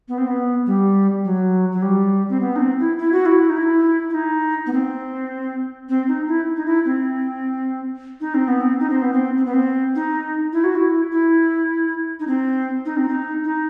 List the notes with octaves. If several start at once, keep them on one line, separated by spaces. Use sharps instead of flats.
B3
C4
B3
G3
F#3
F#3
G3
C4
B3
D#4
C4
E4
E4
F#4
E4
D#4
E4
E4
D#4
B3
C4
C4
D#4
E4
D#4
E4
C4
D#4
C4
B3
C4
D#4
C4
B3
C4
C4
B3
C4
D#4
E4
F#4
E4
E4
D#4
C4
D#4
C4
D#4
D#4